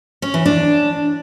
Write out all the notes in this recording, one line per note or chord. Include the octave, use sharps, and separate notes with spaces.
C#4
E3
D4